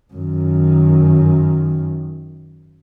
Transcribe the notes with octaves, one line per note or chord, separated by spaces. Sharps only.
F#2 D#3